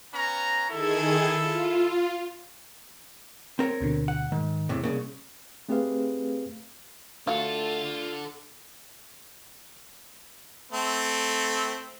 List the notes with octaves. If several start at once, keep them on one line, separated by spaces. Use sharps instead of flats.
B3 C#4 A#5
D#3 E4 G#4 A4 G#6
F4
C4 A#4 C#5
D2 B2 D3
F#5
G#2 D#3
E2 A2 C3
C2 G#2 C#3 A#3
A3 C4 G4 G#4 B4 F5
A3 D4 F4 F#4 A4 F5
A3 C4